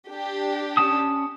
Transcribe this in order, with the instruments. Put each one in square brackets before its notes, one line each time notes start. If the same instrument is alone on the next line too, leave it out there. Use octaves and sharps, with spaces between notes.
[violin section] D4 G4
[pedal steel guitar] C#4 A5 D#6